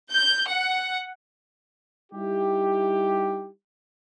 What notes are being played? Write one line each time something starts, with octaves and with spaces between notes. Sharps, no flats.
G6
F#5
G3 D#4 E4 G4